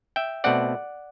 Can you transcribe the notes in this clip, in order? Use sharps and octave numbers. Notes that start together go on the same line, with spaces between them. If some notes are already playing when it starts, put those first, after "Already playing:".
E5 G5
B2 A3 C4 D5 F#5